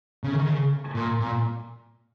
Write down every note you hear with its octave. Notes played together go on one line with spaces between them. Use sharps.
C#3
D#3
C#3
A#2
A#2